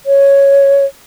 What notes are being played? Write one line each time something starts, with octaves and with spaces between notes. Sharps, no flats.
C#5